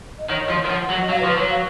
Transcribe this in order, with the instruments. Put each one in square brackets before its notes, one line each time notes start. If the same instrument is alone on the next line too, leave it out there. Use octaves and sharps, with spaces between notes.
[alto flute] D#5
[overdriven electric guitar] D#3 [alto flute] C#5
[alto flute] D#5
[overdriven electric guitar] F3
[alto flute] C#5
[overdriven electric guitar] D#3
[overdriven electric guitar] F3 [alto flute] F#5
[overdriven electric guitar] F#3
[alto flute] D#5
[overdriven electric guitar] F#3 [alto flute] F5
[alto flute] B4
[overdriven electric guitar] F3
[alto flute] B4
[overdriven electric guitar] F#3 [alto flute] C#5
[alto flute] F5